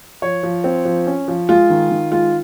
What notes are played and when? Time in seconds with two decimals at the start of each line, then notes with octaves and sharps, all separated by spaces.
0.22 F3 C#5
0.43 F3
0.64 C4
0.85 F3
1.07 C#4
1.28 F3
1.49 G#3 F4
1.70 D#3
1.91 D#3
2.12 G#3 F4